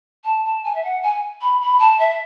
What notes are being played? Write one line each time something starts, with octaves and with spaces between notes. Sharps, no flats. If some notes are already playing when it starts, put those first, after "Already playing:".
A5
A5
G#5
E5
F#5
G#5
B5
B5
A5
E5